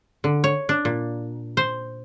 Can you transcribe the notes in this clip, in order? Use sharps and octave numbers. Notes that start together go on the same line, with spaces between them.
D3
C#5
D4
A#2
C5